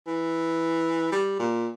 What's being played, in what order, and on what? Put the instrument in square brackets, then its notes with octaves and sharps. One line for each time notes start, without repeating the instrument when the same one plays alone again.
[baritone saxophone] E3
G3
A#2